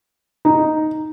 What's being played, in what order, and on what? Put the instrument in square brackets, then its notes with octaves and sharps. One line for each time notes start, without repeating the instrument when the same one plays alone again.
[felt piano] D#4